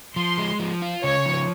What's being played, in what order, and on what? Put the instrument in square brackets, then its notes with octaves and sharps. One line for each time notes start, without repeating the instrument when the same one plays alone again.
[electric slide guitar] F3 [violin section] C6
[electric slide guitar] G#3
F3
F4
[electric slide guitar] C#3 [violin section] C#5
[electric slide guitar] F3